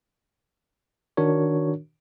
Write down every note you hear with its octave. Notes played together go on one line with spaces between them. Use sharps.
D#3 D4 F#4 A#4 C#5